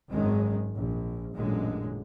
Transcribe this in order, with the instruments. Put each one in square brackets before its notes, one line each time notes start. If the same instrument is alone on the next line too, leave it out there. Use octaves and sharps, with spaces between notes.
[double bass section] G#1 F#2 D#3 G#3
A#1
A1 F#2 A#2 D3 G#3